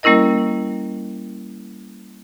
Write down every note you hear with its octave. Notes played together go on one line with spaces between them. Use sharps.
G3 A#3 C#4 E4 A#4 D#5